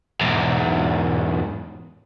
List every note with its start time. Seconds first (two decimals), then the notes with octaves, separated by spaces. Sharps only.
0.21 E2 G#2